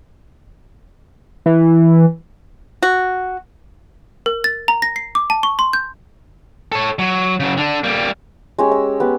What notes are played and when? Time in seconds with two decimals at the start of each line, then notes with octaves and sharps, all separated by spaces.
1.46 E3
2.82 F#4
4.26 A#4
4.44 A6
4.68 A#5
4.82 A#6
4.96 C7
5.15 D6
5.30 A5
5.43 C#6
5.59 C6
5.73 G6
6.72 A4 C#5
6.99 F#3
7.40 C#3 F#3
7.57 D3 D4
7.84 G3 A#3
8.58 G#3 C#4 G4
8.71 E6
9.00 B3 G4